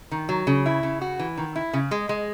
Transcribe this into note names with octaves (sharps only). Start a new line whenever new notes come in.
D#3
F#3
C#3
E4
C#3
F#4
E3
D#3
E4
C#3
G#3
G#3